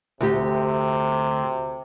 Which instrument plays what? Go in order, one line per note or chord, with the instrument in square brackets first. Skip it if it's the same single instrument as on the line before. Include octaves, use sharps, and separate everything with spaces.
[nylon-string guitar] D2 G4 [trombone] C3